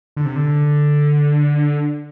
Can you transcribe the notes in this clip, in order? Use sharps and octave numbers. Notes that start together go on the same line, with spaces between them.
D3
C3
D3